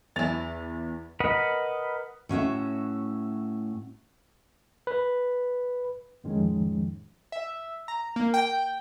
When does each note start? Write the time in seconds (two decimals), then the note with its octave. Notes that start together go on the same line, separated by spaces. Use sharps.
0.16 E2 E3 E4 A6 F7
1.20 A#4 B4 D#5 F#5 B5
2.29 A2 C#4 F#4 E5
4.87 B4
6.24 F2 A2 D#3 F3 G#3 C#4
7.32 E5
7.88 A#5
8.16 A#3
8.34 G5